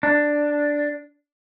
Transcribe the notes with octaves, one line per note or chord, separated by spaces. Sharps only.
D4